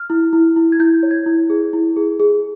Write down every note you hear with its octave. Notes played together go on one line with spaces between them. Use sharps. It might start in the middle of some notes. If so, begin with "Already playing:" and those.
Already playing: F6
E4
E4
E4
G#6
E4 G6
C#5
G#6
E4
G#4
E4
G#4
G#4